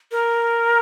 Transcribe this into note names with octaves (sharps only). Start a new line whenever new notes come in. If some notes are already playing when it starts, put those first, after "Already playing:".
A#4